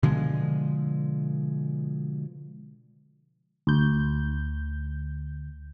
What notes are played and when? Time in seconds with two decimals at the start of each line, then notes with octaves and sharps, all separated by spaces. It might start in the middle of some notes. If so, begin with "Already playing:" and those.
0.03 B2 D3 F3 G#3
3.67 D2 G6